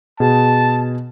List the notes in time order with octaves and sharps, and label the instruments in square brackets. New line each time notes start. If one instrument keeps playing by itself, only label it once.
[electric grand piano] B2 G#4 [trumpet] A5